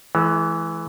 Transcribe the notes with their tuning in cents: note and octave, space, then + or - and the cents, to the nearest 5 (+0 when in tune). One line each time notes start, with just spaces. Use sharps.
E3 +0 G#3 +45